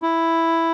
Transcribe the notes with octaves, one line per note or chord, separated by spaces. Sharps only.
E4